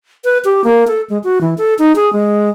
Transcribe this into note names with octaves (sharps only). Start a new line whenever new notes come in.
B4
G4
A#3
A4
G#3
F#4
E3
A4
D#4
G#4
G#3